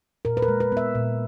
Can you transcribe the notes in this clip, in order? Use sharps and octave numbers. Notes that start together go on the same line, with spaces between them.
A#2 A#4
B4
A#4
G#3
B4
B3 E5
A#2